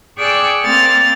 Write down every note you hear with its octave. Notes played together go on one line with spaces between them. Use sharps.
G#4 D5 G5 C#6 E6 F#6
A#3 C4 F6 A6